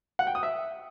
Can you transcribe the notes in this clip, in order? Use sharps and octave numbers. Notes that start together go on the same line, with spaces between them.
F#5
G5
D#6
E5